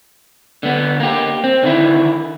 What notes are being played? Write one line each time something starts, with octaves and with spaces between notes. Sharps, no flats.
D3 B3
A#3 G4
C4
D3 D#3 E4